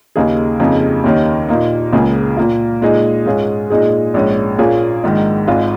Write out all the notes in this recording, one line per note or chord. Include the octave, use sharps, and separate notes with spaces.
D#2 C#3 A#3 D#4 G#4
F2 C#3 A#3 D#4 G#4
D#2 D#3 A#3 C#4
A#2 A#3 D#4
C#2 C#3 A#3 F4 G#4
A#2 A#3 F4
A#2 G#3 D#4 G#4
G#2 G#3 C#4 F4 G#4
A#2 G#3 D#4 G#4
A#1 G#2 G#3 C#4
A#2 A#3 C#4 F4 G#4
A#1 G#2 D#3
G#1 G#2 G#3 F4 G#4